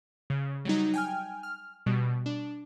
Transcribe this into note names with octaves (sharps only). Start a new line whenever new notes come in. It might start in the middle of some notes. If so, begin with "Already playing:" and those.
C#3
F#3 G3 D#4
G5 G#5 F6
F6
B2 G3
D4